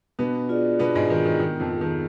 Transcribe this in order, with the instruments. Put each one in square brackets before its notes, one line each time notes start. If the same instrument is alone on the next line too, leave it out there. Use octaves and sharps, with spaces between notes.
[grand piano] B2 B3 [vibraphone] D4
[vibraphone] F4 G#4 D5
[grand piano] B2 B3 [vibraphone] D4
[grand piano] G#2 G#3
[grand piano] D#3 [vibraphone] F4 G#4 D5
[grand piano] D#3
[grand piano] D#3 [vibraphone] B3
[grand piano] F2 F3
[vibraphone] F4 G#4
[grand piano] D#3